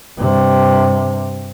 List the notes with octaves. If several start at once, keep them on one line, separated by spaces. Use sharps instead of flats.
G2 C3